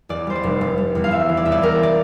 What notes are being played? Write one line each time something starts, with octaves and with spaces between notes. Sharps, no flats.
E2 D5
G3 C5
D5
F1
F1
G3
E2
F5
E2 E5
E3
D5
E2 E5
D5
E2 A#4
D5